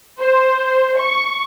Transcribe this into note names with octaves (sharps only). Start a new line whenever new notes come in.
C5
C#6